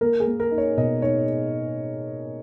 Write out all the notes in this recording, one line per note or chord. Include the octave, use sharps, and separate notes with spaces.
A#3 A#4
G#4
A#3
A#4
D#4
C#5
B2 D#5
D#4 C#5